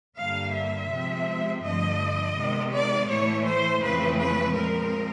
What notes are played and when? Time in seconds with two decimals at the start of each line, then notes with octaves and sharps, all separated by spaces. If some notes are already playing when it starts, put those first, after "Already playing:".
0.18 G2 D3 G3 A#3 F5
0.54 E5
0.90 C3 F3 G#3 C4
1.64 G2 D3 F3 A3 D#5
2.37 C3 D#3 G#3 B3
2.73 D5
3.09 A2 E3 A3 C#5
3.46 C5
3.82 F2 C#3 E3 A3 C4 B4
4.18 B4
4.55 A#2 F3 G#3 C4 A#4